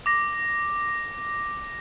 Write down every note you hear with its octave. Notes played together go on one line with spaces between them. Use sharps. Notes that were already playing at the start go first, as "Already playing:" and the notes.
D6 A#6